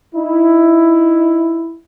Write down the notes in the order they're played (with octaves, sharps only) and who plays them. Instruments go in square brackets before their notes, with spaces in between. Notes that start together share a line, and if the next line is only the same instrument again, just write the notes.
[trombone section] D#4 E4